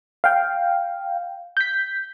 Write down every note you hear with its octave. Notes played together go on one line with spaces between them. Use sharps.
F5 G5
G6 B6